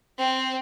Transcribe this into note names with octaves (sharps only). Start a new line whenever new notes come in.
C4